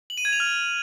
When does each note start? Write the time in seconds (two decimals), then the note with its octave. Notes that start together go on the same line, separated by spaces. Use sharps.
0.10 F#7
0.17 D#7
0.25 G#6
0.32 F7
0.40 F6